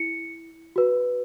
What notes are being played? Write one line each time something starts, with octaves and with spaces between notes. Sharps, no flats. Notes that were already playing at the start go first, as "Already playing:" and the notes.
Already playing: E4 C#7
F#4 B4